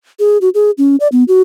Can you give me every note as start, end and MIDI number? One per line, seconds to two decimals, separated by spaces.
0.19 0.38 68
0.41 0.49 66
0.54 0.71 68
0.78 0.96 61
1.00 1.08 74
1.12 1.24 59
1.28 1.42 66